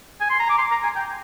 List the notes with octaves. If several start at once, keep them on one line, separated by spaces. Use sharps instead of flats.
G#5
C6
A#5
D6
C6
A#5
G#5
G5